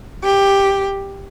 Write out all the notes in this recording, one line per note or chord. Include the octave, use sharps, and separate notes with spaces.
G4